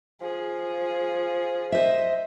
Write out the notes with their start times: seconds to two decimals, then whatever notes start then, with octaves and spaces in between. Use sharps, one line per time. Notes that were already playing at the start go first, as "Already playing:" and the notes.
0.22 F3 G#4
1.72 C5 D#5 E5